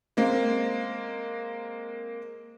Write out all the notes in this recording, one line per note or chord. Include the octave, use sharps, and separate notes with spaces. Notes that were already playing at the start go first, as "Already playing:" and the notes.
G#3 A#3 C4